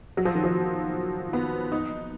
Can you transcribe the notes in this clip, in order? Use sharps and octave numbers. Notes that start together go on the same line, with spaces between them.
F#3
F3
D#3
F3
B3
D#4